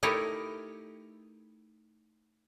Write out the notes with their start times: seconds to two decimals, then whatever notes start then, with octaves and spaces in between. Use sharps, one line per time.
0.03 A3 D#4 E4 G4 A#4 C#5